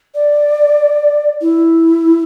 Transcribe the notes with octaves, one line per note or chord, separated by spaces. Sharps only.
D5
E4